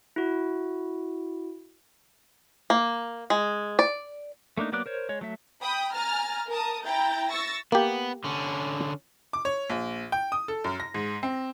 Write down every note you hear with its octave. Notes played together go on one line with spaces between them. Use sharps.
E4 F#4
A#3
G#3
D5
A3 A#3 D4 D#4
F#3 A#3 B3 D5 F#6
A#4 C5 C#5
G#3 C#5
F#3 A3 E5
G5 B5 D#6
G#5 A#5 F6 A6
A#4 A5 D#6
E4 G5 A#5 G6 A6
C#6 E6 A6 A#6
A#3 B3 G4
D3 C#4
D6
C#5
A#1
G5
D#6
A4
F#2
A#6
G#2
C4